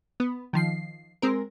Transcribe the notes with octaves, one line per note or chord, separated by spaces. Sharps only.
B3
D#3 F3 C7
G#3 C4 A#4